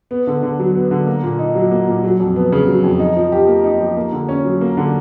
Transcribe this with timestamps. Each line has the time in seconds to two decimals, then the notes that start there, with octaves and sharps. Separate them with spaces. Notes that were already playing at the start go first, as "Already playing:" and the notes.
0.11 B3
0.27 D3
0.43 D3
0.59 F#3
0.75 B3
0.91 D3
1.07 A#3
1.23 A#2
1.39 D#4
1.55 F#3
1.71 A#3
1.88 A#2
2.04 F#3
2.20 F2
2.36 B3
2.52 C#3
2.68 F#3
2.84 F2
2.99 D#4
3.16 F3
3.32 G4
3.48 A#3
3.64 D#4
3.80 F3
3.97 A#3
4.12 D3
4.29 C#4
4.45 F#3
4.61 A#3
4.77 D3